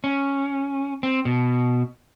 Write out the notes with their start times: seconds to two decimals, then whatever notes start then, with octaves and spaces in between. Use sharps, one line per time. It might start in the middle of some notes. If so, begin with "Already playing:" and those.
0.04 C#4
1.03 C4
1.25 B2